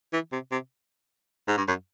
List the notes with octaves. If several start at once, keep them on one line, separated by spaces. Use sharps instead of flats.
E3
C3
C3
G#2
G2
F#2